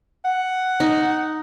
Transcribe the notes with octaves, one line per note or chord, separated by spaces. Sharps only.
F#5
D#4